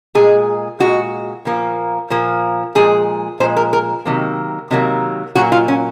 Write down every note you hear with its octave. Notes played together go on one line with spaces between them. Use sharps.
A#2 G#3 G#4
A#2 G#3 F#4
A#2 F3 A#3
A#2 F3 A#3
A#2 F3 G#3 G#4
A#2 F3 G#3 C5
A#4
A#4
C3 D#3 F#3 A#3
C3 D#3 F#3 A#3
A#2 F#3 A#3 F#4
F4
C#4